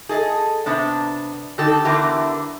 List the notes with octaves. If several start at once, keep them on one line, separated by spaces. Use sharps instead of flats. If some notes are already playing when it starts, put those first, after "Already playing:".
G#4 A4 D#5
C3 B3 D4
D3 D#4 G4 A4
E2 D3 E3 G4 A#4